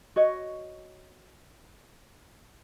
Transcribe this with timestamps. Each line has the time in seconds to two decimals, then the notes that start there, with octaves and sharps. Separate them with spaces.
0.16 F#4 C#5 D#5